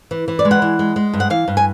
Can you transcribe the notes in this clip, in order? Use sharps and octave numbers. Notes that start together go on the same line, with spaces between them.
E3
E3
D5
G#3
F#5
E3
G#3
G#3
G2
F#5
E3 F5
G2
G#5